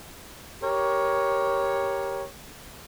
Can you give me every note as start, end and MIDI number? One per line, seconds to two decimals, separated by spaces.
0.62 2.24 67
0.62 2.24 70
0.62 2.24 73